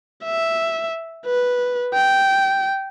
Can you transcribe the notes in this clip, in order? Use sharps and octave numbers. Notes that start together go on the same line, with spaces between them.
E5
B4
G5